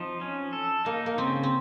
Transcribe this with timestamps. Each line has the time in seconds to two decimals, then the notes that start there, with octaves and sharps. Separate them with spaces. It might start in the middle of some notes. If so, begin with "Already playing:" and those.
Already playing: F3 C4 D#4
0.21 C#4
0.53 A4
0.85 A#3 D#4
1.06 A#3
1.18 C#3 C4
1.43 C4